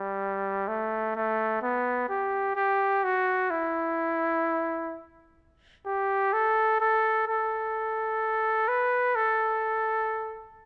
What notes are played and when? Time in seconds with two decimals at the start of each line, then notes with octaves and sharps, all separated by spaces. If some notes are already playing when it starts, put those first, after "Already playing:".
Already playing: G3
0.68 A3
1.16 A3
1.62 B3
2.09 G4
2.56 G4
3.04 F#4
3.50 E4
5.86 G4
6.33 A4
6.81 A4
7.27 A4
8.68 B4
9.15 A4